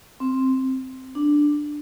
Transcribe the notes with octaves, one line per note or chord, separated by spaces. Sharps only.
C4
D4